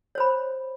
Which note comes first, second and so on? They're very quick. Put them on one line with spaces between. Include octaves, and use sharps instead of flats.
C#5 C5 B5